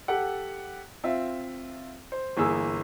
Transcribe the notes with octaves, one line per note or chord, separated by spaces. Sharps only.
G4 A4 F#5
C4 F4 E5
C5
G1 E3 A#3 G#4 E6